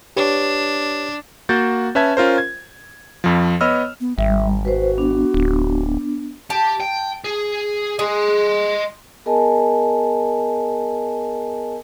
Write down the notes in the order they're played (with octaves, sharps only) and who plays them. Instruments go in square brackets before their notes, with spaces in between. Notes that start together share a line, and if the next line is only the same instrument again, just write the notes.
[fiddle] D4 [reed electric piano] G4 B4 C#5
[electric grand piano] A#3 F#4 F#5 G6 A6
C#4 B4 E5 A5 G#6
C#4 F4 A#4 C5
G#6
F2 F3
B3 C#5 D#5 B5 E6 F6
[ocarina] B3
[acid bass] G#1 [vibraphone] G3 [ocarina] E5
[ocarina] F#4 [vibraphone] B4 C5
[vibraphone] B3 D4
[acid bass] D1
[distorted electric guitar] G4 [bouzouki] A5
[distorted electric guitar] G5
G#4
[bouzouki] G#4 [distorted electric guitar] D#5 C6
[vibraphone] B3 G#4 A#4 D#5 G#5 A5